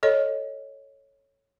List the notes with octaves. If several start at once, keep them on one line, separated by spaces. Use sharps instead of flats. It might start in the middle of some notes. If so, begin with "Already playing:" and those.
A4 C#5 D#5